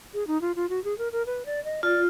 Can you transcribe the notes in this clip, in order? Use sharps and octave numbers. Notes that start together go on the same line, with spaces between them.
G#4
D#4
F4
F4
F#4
G#4
A#4
A#4
B4
D5
D#5
F4 D5